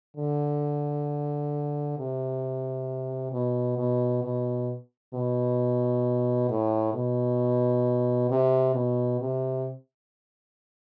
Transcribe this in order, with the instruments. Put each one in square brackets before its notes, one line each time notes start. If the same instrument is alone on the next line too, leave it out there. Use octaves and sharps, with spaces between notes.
[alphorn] D3
C3
B2
B2
B2
B2
A2
B2
C3
B2
C3